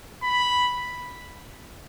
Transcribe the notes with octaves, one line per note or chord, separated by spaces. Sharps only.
B5